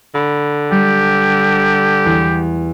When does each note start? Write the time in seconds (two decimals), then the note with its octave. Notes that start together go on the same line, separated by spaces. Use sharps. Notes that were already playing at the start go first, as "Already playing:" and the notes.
0.15 D3 B5
0.72 G3 G4
2.06 E2